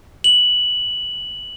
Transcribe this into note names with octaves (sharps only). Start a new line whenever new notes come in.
F#7